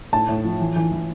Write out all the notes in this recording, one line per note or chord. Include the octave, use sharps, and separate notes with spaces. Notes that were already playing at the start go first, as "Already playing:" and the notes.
A2 A5
A2
F3
E3
E3
E3